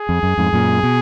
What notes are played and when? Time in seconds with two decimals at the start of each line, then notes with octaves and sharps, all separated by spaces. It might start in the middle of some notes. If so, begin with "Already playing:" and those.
Already playing: G#4
0.09 F2
0.23 F#2
0.38 F2 G#2
0.53 F#2 A#2
0.83 B2